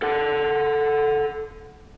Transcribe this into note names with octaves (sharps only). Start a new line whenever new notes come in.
A4 F#5